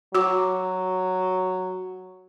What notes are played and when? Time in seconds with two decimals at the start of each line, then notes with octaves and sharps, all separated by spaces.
0.15 F#3 F#4 D6